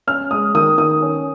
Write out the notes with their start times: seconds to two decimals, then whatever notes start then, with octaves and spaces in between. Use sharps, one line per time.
0.07 C#4 F6
0.31 G#3 D#6
0.55 D#3 D#6
0.78 D#3 D#6
1.02 C#4